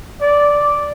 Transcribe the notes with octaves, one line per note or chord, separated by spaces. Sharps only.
D5